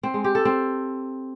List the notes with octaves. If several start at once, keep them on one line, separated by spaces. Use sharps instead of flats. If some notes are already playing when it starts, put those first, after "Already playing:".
C4
G#3
G4
A4
C4